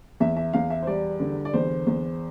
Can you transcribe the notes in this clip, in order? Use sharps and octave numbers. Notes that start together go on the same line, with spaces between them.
E2 E5
E5
E2 F5
E5
C5
G3 D5
D3
D5
E2 C5
E2